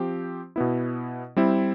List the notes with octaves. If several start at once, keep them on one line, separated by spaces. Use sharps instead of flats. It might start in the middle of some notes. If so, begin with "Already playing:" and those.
Already playing: F3 C4 G4
B2 B3 E4
G3 C4 E4